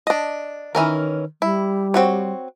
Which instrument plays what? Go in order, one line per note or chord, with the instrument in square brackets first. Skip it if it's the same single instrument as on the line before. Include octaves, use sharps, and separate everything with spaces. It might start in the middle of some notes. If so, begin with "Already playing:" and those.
[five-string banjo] D4 D#5
[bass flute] D#3 [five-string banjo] E3 C#4 A#4
[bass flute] G3 [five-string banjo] E4
[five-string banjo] C4 F#4 C#5